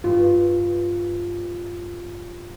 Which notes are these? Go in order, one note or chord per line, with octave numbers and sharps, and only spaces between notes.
G2 F4